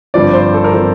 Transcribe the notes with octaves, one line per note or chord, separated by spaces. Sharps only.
G1 G2 F3 C4 D5
C5
A4
A#4
F3 C4 A4